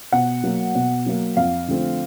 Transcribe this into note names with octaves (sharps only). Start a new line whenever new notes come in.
B2 F#5
F#3 A#3
B2
F#3 A#3
F2 F5
D3 F3 A3 C4